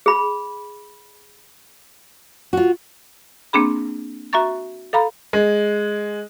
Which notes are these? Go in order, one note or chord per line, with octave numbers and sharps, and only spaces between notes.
G#4 B5
F4 F#4
A#3 C4 D4 G#4 B5
F#4 E5 A#5 C#6 A6
A4 F5 A#5 B5
G#3